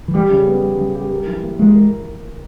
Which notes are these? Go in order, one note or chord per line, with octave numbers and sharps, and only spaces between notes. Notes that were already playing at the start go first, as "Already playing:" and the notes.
E3
G3 G4
C#3
B3
G4
C#3
G4
A#4
E3
A#3
G#3 A#3
A#4